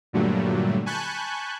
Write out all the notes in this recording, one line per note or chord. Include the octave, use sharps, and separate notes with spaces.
G2 A#2 D3 F#3 G3 A3
G#5 A5 B5 C#6 F#6 G6